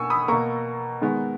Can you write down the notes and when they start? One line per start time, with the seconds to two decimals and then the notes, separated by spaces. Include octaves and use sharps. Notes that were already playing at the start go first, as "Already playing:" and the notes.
Already playing: B2 A#3 G#5 C#6 E6
0.10 B5 D#6
0.28 B2 A#3 A#5 C#6
1.01 D#3 G#3 B3